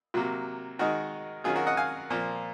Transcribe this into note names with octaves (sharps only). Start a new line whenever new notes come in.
C3 F#3 A#3
D#3 G#3 D#4 F#4 A#4
D#3 F#3 C#4 F4 G#4
F#4 A#4
D#5 F#5
F5 G#5
A#2 F3 A#3